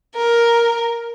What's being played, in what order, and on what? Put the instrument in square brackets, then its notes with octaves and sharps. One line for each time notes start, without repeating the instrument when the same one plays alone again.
[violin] A#4